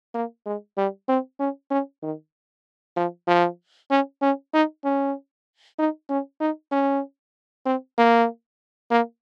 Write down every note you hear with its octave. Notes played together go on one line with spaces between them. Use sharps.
A#3
G#3
G3
C4
C#4
C#4
D#3
F3
F3
C#4
C#4
D#4
C#4
D#4
C#4
D#4
C#4
C4
A#3
A#3